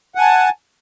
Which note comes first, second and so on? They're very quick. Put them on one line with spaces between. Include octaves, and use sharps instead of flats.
F#5 G#5 A5